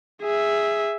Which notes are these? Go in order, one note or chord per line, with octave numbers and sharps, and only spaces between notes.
G#4 E5